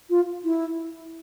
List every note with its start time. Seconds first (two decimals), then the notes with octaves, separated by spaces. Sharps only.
0.10 F4
0.45 E4